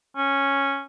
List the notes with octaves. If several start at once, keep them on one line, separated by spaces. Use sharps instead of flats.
C#4